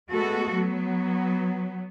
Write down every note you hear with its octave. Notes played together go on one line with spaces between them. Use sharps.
G#3 A3 B3 F#4 A4
F#3 B3